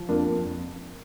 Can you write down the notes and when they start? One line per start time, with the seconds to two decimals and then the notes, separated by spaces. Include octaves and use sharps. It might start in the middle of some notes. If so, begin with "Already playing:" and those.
Already playing: F3
0.09 F2 A#3 D4
0.26 F2